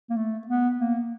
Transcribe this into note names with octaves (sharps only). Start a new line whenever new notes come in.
A#3
A3
B3
A#3